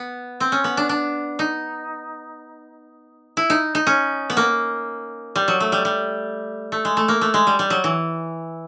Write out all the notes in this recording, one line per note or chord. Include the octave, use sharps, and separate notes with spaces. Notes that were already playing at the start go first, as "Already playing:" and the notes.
Already playing: B3
C4
C#4
B3
D4
D4
D#4
E4
D#4
D#4
C#4
B3
A#3
G3
F#3
A3
G3
G3
A3
G#3
A3
A#3
A3
G#3
G3
G3
F#3
E3